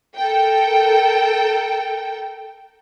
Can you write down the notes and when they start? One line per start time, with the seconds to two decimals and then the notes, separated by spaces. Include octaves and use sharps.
0.16 A4 A#4 G5